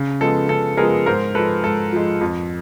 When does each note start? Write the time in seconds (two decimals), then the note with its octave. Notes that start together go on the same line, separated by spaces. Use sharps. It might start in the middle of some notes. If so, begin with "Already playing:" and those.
Already playing: C#3
0.21 F3 G#3 B3 A4
0.49 C#3 A4
0.77 F3 G#3 B3 G#4 A#4
1.06 G#2 A#4 C5
1.35 F3 G#3 A4 B4
1.64 G#2 A4
1.92 F3 G#3
2.21 F2